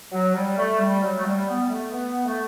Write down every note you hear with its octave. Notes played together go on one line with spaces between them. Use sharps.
F#3
G3
A3
G3
F#3
A3
G3
B3
G3
A3
B3
A3